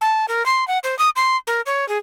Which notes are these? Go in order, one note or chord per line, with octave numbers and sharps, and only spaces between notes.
A5
A#4
C6
F#5
C5
D#6
C6
A#4
C#5
G#4